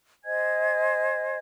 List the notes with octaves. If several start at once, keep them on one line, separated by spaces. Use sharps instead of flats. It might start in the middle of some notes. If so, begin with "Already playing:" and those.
C5 D#5 G#5 G#6